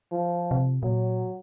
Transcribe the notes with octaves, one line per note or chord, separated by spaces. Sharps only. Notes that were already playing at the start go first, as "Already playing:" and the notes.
F3
C3
A#2 F#3